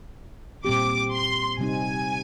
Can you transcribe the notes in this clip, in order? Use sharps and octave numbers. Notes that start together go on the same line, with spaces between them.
A#2 G3 C4 G4 D6
C6
C3 G3 C4 D#4 G#5